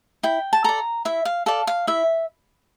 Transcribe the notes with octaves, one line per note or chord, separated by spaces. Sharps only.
E4 G5
A5
A4 D5 A#5
E4 E5
F5
A4 D5 F5
F5
E4 E5